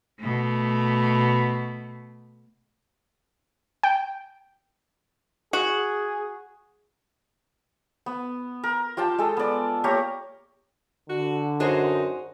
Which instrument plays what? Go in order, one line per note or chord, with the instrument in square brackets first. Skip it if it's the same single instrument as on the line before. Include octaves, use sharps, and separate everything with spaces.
[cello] B2 A3
[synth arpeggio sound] G5
[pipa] F#4 [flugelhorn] G#4
[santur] B3
A#4
F4 G4 G5 A5
G#3 A4
B3 D5
A#3 G4 C#5 A#5
[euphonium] D3 [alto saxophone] F#4
[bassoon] F#2 [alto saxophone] D#4 [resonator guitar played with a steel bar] F#4 G#4 C5